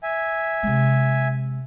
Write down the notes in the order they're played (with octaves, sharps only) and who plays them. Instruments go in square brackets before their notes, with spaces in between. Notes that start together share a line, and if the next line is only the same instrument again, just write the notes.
[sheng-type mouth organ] E5 G#5
[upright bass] C3 G#3